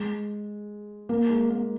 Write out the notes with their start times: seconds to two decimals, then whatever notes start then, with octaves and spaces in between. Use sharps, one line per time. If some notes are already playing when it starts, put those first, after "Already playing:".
Already playing: G#3
1.09 A#3
1.30 G#3
1.50 A#3